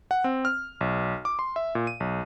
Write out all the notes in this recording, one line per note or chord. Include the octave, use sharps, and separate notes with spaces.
F#5
C4
F6
B1
D6
C6
E5
A#2
D#7
B1